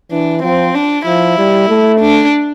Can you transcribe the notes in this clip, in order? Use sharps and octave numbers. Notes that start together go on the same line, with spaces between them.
E3 D4
F3 C4
D4
F3 E4
G3
A3
D4